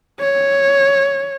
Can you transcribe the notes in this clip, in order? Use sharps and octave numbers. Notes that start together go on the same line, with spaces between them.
C#5